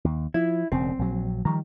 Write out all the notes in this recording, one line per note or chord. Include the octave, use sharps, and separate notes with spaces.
D#2
F3 E4
E1 C#3 C4
A#1 F#3
D#3 F3 G3 A#5